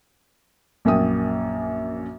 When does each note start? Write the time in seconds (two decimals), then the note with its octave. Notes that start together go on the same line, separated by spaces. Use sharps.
0.85 A#1 F#2 A#3 G5 D#6